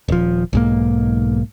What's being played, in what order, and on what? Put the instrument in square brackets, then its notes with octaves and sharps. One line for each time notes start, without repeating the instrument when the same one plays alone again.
[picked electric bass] D#1 F3
B1 G#2 A#3